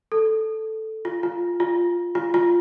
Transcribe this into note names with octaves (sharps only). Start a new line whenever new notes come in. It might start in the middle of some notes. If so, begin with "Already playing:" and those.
A4
F4
F4
F4
F4
F4